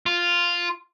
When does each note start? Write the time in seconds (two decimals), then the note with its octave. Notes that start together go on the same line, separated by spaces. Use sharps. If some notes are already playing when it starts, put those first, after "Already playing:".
0.06 F4